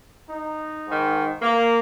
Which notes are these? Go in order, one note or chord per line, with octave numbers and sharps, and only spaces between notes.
D#4
G#2 D#3
A#3